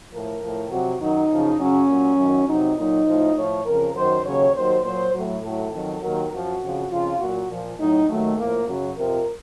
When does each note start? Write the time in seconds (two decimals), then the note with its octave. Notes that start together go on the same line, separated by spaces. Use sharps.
0.11 A2 F3 A#4
0.41 A2 F3
0.70 F2 C3 F#3 F#4
1.00 F#2 D#3 F#3 D#4
1.29 F#2 C#3 F3
1.59 F#2 C#3 F#3 C#4
1.88 A#2 F#3
2.17 F#2 D#3 F#3
2.47 F2 C3 F#3 D#4
2.76 A#2 F#3 D#4
3.06 A2 F3
3.36 A2 F3 C#5
3.65 F2 C#3 F3 A#4
3.95 F#2 D#3 F#3 C5
4.24 D#2 C#3 F#3 C#5
4.54 D#2 D#3 F#3 C5
4.84 A#2 F#3 C5
5.13 A2 F#3
5.42 A2 F#3 A4
5.72 F2 D#3 F#3
6.01 D#2 D#3 F#3 A#4
6.31 F#2 F3 F#4
6.61 F2 C#3 F3
6.90 F2 C#3 F3 F4
7.19 A#2 F#3 F#4
7.50 A#2 F3
7.79 A2 F#3 D#4
8.08 D#2 D#3 F#3 A3
8.38 A2 F3 A#3
8.67 F#2 C#3 F#3
8.97 F2 C3 F3 A#4